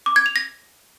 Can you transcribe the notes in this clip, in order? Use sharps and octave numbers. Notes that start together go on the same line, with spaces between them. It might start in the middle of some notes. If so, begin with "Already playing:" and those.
D6
G#6
F7
A#6